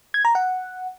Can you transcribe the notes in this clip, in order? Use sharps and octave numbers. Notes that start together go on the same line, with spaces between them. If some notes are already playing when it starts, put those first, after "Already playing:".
G#6
A#5
F#5